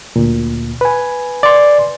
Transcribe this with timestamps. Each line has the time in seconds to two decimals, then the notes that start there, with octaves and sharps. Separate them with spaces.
0.16 D2 A#2
0.81 B4 G#5
1.43 D5 C6